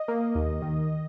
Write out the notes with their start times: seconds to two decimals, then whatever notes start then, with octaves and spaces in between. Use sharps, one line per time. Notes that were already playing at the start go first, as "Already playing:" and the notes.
Already playing: D#5
0.08 A#3
0.35 D#2
0.62 D#3